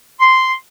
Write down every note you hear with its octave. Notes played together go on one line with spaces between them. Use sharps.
C6